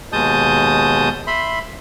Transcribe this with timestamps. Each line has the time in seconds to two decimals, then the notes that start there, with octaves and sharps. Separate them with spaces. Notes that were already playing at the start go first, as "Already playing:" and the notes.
0.12 D#2 B2 G#3 A5 D#6 G6
1.27 E5 B5 C6